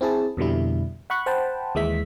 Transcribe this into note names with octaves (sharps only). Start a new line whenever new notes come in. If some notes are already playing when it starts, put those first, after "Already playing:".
C4 E4 G#4 A5
F2 B2 D3 G3 E4
F#5 B5 C#6 F#6
C5 F#5 G5 A5 B5
D#2 E3 G#3 E5 B6